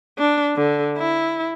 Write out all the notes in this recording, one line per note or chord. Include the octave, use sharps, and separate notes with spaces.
D4
D3
E4